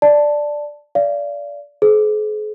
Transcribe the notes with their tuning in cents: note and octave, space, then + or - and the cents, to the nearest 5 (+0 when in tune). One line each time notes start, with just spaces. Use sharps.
D5 +0 A5 +0
D5 -25 F5 -30
G#4 +40 C5 -10